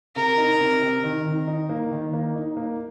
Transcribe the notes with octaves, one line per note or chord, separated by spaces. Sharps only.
C3 A#4
D#4
C3
C3
D#3
D#3
D#4
A#3
D#3
A#3
D#4
A#3